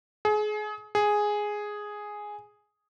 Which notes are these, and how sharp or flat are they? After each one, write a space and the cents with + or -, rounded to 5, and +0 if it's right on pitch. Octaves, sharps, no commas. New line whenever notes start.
G#4 +30
G#4 +0